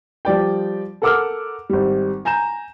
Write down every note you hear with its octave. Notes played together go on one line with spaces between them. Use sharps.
F3 G3 D5 G5
A4 A#4 F#5 D6 E6 F6
G#1 G3
G#5 A#5 G6 E7